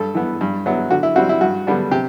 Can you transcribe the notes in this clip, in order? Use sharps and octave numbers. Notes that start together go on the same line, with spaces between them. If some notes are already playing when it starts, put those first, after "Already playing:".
Already playing: G2 A4
E3 B3
G2
F#3 B3 E4
D3 F#4
E4
G3 C4 E4 F#4
E4
G2 F#4
D3 G3 B3 D4
C3 G4